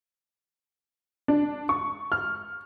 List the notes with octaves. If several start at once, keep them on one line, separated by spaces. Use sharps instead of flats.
D4
C#6
F6